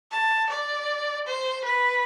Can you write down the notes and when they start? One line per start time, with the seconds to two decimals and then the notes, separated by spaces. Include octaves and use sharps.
0.11 A5
0.50 D5
1.27 C5
1.64 B4